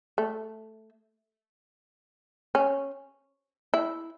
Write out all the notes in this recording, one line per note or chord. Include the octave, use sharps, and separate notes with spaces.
A3
C#4
E4